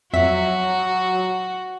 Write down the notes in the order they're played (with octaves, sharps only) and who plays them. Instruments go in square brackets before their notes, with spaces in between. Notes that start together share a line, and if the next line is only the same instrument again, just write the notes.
[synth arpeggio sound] F2 E5 B6 [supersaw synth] F#3 [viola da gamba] F#4